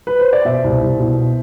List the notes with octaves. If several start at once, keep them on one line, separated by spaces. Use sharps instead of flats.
B4
C5
D5
B2 C5 E5
C2
C2
B2